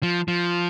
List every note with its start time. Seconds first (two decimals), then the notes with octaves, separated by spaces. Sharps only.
0.03 F3
0.28 F3